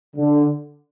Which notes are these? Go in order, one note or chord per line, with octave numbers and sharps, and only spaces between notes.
D3